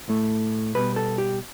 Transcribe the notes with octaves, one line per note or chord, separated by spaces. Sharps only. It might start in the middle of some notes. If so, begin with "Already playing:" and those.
A2 A3
B2 G3 B3 B4
A4
G4